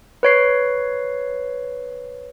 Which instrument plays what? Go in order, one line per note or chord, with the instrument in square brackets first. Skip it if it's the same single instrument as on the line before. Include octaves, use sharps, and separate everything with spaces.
[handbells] B4 C#5 C7